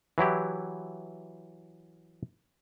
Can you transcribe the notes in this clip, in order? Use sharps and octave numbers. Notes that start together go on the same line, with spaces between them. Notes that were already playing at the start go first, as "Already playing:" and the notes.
E3 F#3 E4 G4